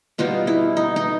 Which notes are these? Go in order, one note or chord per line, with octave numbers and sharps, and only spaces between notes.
B2 G3 B3 D#4 F4
E4
D#4
D#4